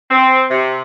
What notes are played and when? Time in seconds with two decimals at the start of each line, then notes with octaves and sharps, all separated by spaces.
0.10 C4
0.51 C3